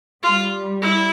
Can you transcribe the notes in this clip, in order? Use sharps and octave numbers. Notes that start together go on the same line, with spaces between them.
G3 F4
E4